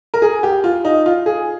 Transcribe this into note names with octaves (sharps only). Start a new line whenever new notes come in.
A#4
G#4
G4
F4
D#4
F4
G#4